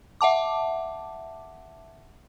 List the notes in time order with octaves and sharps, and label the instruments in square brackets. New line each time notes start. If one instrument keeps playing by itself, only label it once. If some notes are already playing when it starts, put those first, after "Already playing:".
[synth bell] E5 F#5 A5 D6